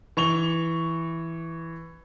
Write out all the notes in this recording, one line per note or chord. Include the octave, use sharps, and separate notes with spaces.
E3 C#6 F7 G7